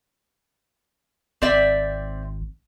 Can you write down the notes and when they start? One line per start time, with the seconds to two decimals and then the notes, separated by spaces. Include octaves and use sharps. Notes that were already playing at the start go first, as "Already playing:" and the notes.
1.42 G#1 C4 D5 E5